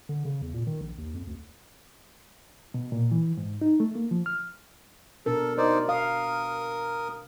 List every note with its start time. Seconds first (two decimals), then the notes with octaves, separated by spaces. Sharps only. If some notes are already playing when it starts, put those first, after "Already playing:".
0.09 D3
0.25 C#3
0.42 E2
0.54 A#2
0.67 D#3
0.81 A#1
0.98 D#2
1.14 F2
1.27 D2
2.74 B2
2.92 A#2
3.12 E3
3.37 G#2
3.61 D#4
3.80 A3
3.95 A#3
4.11 F3
4.26 F6
5.26 B2 D4 A4 A#4
5.58 D#4 A#4 C5 D5
5.89 A#4 F5 D#6